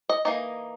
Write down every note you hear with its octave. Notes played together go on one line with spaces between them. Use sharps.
D#5
E3 A#3 D#4 D#5